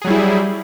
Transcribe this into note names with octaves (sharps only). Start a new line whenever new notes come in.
F#3 G3 E4 G#4